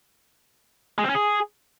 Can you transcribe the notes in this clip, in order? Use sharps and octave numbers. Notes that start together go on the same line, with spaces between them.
G#3
C4
C#4
G#4